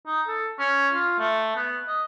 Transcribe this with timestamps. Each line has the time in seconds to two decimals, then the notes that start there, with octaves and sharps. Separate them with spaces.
0.07 D#4
0.28 A4
0.59 C#4
0.94 F4
1.19 A3
1.56 B3
1.88 D#5